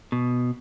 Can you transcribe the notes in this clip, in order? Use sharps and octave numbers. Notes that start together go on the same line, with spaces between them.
B2